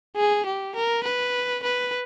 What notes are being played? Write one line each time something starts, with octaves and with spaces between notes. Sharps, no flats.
G#4
G4
A#4
B4
B4